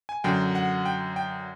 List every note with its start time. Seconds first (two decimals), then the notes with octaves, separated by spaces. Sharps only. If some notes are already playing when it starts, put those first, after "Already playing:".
0.09 G#5
0.24 F#2 D3 F#3 G5
0.55 F#5
0.85 G5
1.16 G5